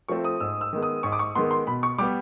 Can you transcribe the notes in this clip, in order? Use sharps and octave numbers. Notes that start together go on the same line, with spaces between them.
F3 A3 C4 C#6
D#6
G#2 E6
E6
D#3 G#3 B3
D#6
G#2 C#6
D6
C#6
D#3 G#3 B3 C6
C6
B2 B5
C#6
G3 B3 D6